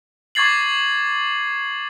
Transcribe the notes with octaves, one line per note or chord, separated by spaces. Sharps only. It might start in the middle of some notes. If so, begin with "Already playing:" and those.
C#6 D6 G#6 A6 C7 F#7